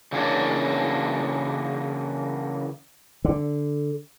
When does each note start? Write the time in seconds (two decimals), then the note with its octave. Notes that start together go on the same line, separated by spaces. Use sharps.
0.13 C#3 E3 A#3 D4 C#5 D5
3.25 D3